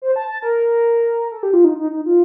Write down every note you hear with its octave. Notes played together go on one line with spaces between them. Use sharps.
C5
A5
A5
A#4
A4
G4
F4
D#4
D#4
D#4
F4